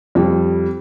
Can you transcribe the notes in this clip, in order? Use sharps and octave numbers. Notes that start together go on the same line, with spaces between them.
F2 G3